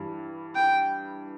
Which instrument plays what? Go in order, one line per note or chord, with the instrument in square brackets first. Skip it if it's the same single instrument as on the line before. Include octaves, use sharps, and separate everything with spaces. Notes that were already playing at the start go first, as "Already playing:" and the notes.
Already playing: [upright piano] G2 E3 G3
[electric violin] G5